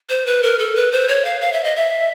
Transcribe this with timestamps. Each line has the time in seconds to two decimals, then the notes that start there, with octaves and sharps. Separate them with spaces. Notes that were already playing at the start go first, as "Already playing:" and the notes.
0.10 C5
0.26 B4
0.43 A#4
0.59 A4
0.76 B4
0.92 C5
1.08 C#5
1.25 F5
1.41 F5
1.53 E5
1.64 D#5
1.76 E5